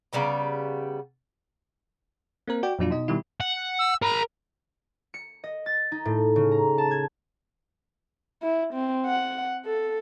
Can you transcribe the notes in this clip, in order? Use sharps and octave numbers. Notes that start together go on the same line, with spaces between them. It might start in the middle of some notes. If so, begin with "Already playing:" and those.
C#3 G3 B3 A#5
A#3 C4 A#4
F#4 D5 G5
F2 A#2 F#3 D4 F4
B2 D#4 D#5
B2 D#3 G3 E4
F#5
E6
A#4 A#5 B5
C#7
D#5
A6
D#4
A2
C#3
A#5
A5
G#6
E4
C4
F#5
A4